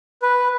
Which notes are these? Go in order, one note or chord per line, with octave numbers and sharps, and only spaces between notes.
B4